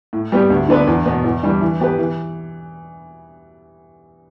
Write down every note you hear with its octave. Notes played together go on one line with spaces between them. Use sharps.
A2
G3 B3 G4
D2
D3 B3 D4 B4
E2
B2 B3
E2
E3 G3 D4
E3
B3 G4 B4
E3